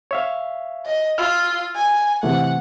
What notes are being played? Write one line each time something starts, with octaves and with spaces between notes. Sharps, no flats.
C#5 E5 F5
D#5
F4 E6 F6
G#5
C3 E3 A3 F#5